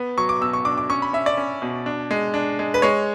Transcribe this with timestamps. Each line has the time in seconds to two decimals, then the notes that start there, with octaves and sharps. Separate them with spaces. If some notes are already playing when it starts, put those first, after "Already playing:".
Already playing: B3
0.17 F#3 C#6
0.29 D6
0.41 B2 E6
0.53 C#6
0.65 D4 D6
0.78 D6
0.90 C#4 C#6
1.02 B5
1.13 C#4 E5
1.26 D5
1.37 C#4
1.62 B2
1.86 D4
2.11 G#3
2.34 D4
2.59 G#3
2.74 B4
2.82 G#3 C#5